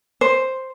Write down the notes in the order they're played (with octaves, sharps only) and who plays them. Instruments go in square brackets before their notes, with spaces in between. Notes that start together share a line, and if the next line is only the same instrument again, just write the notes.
[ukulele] C5